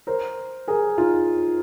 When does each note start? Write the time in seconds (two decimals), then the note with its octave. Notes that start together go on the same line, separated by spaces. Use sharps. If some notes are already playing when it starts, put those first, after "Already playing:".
0.07 A#4 C5
0.68 G#4 A#4
0.98 D#4 F4